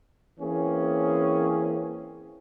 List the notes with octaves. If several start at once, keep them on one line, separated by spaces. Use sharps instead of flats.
E3 A#3 C4 C#4 G#4